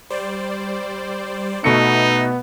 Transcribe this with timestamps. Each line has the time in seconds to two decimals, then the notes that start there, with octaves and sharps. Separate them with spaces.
0.10 G3 C5 D5
1.64 B2 A3 B3 D#4 E5 C#7